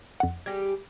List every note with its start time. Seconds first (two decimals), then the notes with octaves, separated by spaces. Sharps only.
0.20 F2 F#5
0.46 G3 G4 G#4 G#6 A#6